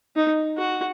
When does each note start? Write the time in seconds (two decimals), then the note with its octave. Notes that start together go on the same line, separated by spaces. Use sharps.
0.16 D#4
0.58 F#4